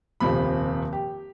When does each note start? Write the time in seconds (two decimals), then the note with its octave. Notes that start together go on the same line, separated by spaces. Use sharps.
0.20 D#1 F2 C3 F3 B5
0.93 G4